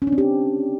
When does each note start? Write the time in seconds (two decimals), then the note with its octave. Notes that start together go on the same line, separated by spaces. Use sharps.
0.02 C#4
0.07 D4
0.13 C4
0.18 G4